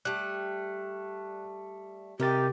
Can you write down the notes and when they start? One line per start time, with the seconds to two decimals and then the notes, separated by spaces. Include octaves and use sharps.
0.05 G3 A3 F#6
2.20 C3 D#4 G4 A#4 A6